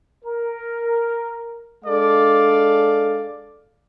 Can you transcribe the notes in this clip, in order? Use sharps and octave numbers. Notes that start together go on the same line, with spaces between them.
A#4
G#3 D4 A4 D5 F5